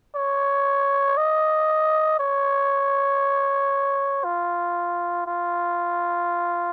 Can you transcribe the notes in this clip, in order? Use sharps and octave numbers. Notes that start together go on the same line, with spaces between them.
C#5
D#5
C#5
F4
F4